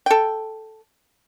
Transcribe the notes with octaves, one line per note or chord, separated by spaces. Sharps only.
A4 G5